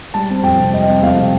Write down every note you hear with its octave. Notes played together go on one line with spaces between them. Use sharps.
G3 A5
C4
F2 G5
C3
G3 D#5
C4
F2 F5
C3